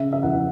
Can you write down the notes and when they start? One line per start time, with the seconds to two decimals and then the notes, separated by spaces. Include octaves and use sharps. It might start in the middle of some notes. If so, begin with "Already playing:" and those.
Already playing: C#3 E5
0.13 E5
0.23 E2 F#5